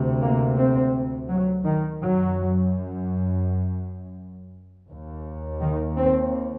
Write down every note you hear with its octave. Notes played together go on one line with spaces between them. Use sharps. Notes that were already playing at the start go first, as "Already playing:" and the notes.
Already playing: D2 C3
A#3
C4
F#3
D#3
F#2 F#3
D#2
D#3
C4